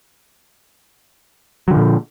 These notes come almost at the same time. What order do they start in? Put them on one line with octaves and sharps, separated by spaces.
F#3 D3 F3 A#2